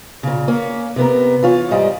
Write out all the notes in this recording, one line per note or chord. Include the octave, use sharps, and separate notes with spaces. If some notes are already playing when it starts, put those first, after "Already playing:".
A#2 C#3
A#3 C#4
C3 B3 A#4
E3 F4 C#5
G#2 G3 D#5 G5